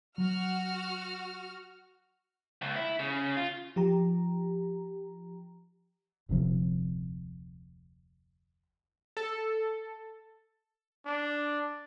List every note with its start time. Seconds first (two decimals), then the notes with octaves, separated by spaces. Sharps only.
0.18 F#3 F#4 F6
2.62 C#2
2.76 E4
2.99 C#3
3.37 F4
3.76 F3 G4 A#5
6.29 F1 D2 C3 F3
9.17 A4
11.06 D4